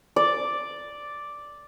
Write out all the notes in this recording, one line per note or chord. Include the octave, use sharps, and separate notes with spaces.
D5